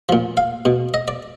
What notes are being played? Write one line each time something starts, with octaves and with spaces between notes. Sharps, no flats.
A#2 F3
F5
B2
D#5
D5